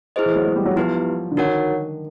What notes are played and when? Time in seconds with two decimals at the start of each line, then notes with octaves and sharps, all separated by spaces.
0.16 E4 G#4 C5 D#5
0.26 E3
0.36 F#3
0.46 G#3
0.56 G3
0.66 F#3
0.76 F3 B3 E4 G4 B4
1.32 D3
1.37 D#3 D#4 F#4 A#4 C#5 F#5